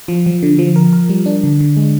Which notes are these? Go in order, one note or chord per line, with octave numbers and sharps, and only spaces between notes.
F3
F3
D3
F3
A#4
A#4
G3
D4
D3
D3
G#3